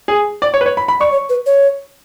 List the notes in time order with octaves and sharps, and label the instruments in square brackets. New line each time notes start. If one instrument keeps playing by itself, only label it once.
[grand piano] G#4
D5
C#5
B4
C#5
B5
B5
[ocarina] D5 [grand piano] C#6
[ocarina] C#5
B4
C#5